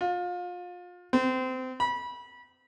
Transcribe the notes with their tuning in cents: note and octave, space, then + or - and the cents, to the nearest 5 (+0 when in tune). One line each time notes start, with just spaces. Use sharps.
F4 +30
C4 -25
B5 -25